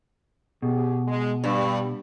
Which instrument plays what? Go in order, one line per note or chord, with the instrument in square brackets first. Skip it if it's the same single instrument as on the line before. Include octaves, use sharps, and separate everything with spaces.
[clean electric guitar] B2 [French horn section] G4 G#4
[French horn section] G#3
[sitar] G2 [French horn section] G3